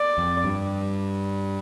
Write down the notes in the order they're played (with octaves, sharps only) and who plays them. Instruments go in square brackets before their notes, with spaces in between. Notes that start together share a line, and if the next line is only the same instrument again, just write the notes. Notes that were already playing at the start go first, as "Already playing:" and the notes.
Already playing: [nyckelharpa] D5
[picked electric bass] F2
G2